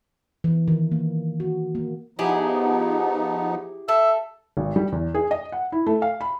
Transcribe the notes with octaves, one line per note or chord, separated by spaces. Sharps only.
E3
D#3
A#3
F#4
A#3
F3 B3 D#4 E4 G4 G#4
A4 E5
G#1
G3
E2
G#4
D#5
F#5
E4
A3
F5
B5